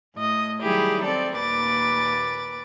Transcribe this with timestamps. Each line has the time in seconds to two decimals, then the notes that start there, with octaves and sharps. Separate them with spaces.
0.16 A2 D#5
0.62 D#3 F#3 G3 E4 G4 G#4
1.04 C4 A4 D5
1.34 D#2 A#2 B4 D6 A6